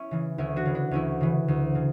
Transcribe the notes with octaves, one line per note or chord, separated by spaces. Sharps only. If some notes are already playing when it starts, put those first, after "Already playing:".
Already playing: C#4 E4
C#3 E3
D2 C#4 E4
D4 F#4
C#3 E3
D4
D2 C#4 E4
C#3 E3
D2
C#3